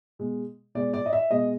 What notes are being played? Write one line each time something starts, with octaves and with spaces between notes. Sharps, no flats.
B2 G#3
B2 G#3 D5
D5
D#5
E5
B2 G#3 D#5